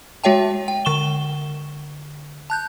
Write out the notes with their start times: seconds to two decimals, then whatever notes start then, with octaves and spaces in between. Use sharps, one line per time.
0.24 G#3 F#4 C#5 E5 G5 A5
0.68 G5
0.85 D3 C#6 E7 G7
2.50 A5 F#6 G6